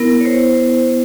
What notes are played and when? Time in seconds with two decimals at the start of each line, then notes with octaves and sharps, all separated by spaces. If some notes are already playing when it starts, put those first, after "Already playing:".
Already playing: B3 E4 A#4
0.20 C#5
0.25 C5